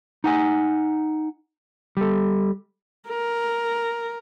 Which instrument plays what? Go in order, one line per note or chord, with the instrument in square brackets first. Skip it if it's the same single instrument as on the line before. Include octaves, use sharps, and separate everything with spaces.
[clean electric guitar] D#4 F#5 G#5
G3 A4
[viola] A#4